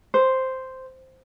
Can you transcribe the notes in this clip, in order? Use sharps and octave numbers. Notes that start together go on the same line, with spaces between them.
C5